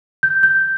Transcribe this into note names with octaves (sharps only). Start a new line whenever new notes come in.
G6
G6